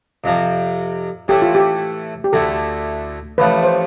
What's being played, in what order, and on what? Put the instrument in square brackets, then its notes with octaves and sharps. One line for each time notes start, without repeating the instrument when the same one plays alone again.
[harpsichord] F2 C3 F3
[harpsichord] A2 E3 A3 E4 [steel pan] G4
[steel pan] F4
G4
G4
[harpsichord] D2 D3 A3 E4 [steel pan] A4
[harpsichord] A1 A2 F3 A3 [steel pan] B4
[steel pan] C5